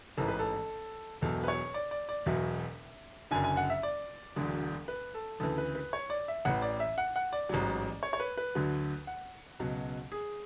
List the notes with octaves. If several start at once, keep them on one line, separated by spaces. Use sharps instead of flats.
A1 G#2 E3 A4
B4
A4
E1 E2 B2 F#3 A4
B4
C#5
D5
D5
D5
E1 E2 B2 F#3 E5
F#1 F#2 D3 G#5
G#5
F#5
E5
D5
E1 D2 D3 F#3
B4
A4
D2 C#3 E3 A4
B4
B4
C#5
D5
E5
A1 A2 E3 F#5
D5
E5
F#5
F#5
D5
A1 G#2 F#3
C#5
C#5
B4
B4
D2 D3 F#3
F#5
C#2 B2 F#3
G#4